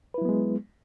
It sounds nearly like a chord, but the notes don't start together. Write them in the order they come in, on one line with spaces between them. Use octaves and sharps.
B4 E4 F#3 B3 G#3